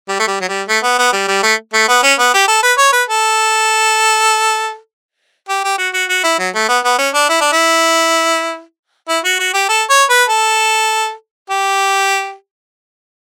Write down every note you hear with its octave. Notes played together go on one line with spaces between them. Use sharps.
G3
A3
G3
F#3
G3
A3
B3
B3
G3
G3
A3
A3
B3
C#4
B3
G4
A4
B4
C#5
B4
A4
G4
G4
F#4
F#4
F#4
E4
F#3
A3
B3
B3
C#4
D4
E4
D4
E4
E4
F#4
F#4
G4
A4
C#5
B4
A4
G4